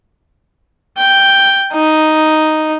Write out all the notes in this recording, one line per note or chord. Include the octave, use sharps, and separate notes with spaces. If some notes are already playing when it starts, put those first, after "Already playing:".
G5
D#4